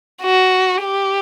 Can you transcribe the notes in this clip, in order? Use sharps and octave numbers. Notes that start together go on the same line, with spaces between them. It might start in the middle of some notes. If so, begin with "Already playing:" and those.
F#4
G4